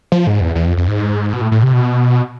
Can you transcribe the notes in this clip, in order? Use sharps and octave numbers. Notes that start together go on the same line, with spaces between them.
F3
G#2
E2
E2
F2
F2
G#2
B2
A2
A2
C3
B2